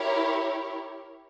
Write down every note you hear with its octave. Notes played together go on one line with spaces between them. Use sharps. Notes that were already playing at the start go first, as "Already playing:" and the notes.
Already playing: E4 G4 A#4 C#5